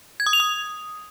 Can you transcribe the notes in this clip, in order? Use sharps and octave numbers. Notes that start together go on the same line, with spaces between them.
G#6
D#6
F7
D#6